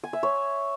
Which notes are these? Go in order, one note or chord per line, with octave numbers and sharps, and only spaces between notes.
G#5
E5
C#5